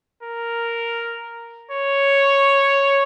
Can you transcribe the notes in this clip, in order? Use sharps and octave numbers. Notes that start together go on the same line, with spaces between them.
A#4
C#5